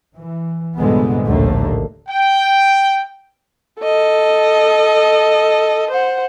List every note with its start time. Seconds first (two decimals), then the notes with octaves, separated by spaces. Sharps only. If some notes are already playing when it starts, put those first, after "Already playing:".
0.15 E3
0.77 C2 G2 A#2 D3 G#3 B3
1.26 A#1 D#2 A2 D3 A3 A#3
2.08 G5
3.81 A4 D#5
5.90 C5 F#5